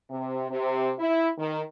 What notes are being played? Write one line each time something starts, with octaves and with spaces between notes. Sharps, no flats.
C3
C3
E4
D#3